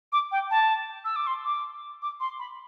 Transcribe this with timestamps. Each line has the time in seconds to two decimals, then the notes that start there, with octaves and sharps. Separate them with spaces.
0.12 D6
0.32 G5
0.51 A5
1.05 E6
1.16 D6
1.27 C6
1.44 D6
2.02 D6
2.20 C6
2.39 B5